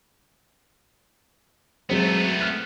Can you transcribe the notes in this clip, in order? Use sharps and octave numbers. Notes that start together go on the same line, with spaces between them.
F#3 G#3 A3 B3 C4
F6 F#6